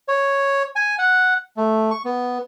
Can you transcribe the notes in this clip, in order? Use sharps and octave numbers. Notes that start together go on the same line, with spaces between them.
C#5
G#5
F#5
A3
C#6
B3